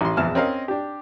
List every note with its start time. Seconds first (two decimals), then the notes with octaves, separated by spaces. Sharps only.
0.01 A1 C6
0.17 A#1 E2 E3 E4 A5 F6
0.35 C4 C#4 A#4 D#5 F5
0.68 D4 G4